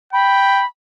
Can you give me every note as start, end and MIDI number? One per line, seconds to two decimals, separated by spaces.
0.13 0.63 79
0.13 0.65 83